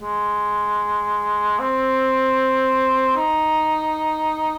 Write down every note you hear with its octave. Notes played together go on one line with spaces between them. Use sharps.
G#3
C4
D#4